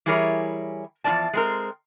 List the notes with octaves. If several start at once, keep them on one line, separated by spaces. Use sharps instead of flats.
E3 G3 E4 G#4 A#4 C#5
E2 F3 A#3 A#4 D5 A5
G#3 C4 A#4